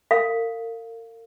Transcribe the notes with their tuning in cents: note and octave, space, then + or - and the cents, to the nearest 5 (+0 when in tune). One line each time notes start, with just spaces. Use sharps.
A#4 -40 F5 +0